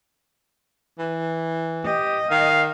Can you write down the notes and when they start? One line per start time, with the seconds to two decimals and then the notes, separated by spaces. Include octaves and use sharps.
0.99 E3
1.85 G4 D#5
2.31 D#3 F5